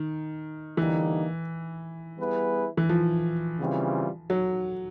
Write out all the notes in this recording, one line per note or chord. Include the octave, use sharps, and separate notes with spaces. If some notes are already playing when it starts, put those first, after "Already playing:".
Already playing: D#3
D3 E3 G3 A#3 D#4
G3 B3 E4 G#4 B4
E3
F3
C#3 E3 G3 C4 F4
F#3